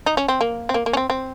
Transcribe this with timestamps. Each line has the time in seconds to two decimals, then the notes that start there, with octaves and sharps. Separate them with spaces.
0.06 D#4
0.17 C#4
0.28 C4
0.41 A#3
0.69 C4
0.74 A#3
0.86 A#3
0.93 C#4
0.97 C4
1.10 C4